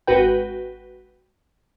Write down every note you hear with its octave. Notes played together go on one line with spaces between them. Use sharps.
G#1 F#4 B4 G5